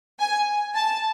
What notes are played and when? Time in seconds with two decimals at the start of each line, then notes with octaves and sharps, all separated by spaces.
0.19 G#5
0.75 A5